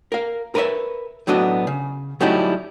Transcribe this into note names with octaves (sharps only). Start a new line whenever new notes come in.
A#4 F5
A#4 B4 C#5 D#5 E5
A2 F#3 B3 D4 F#4 D#5
C#3
F#3 G3 A3 C#4 D#4 E4